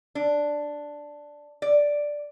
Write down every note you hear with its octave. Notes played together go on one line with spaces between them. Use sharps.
D4
D5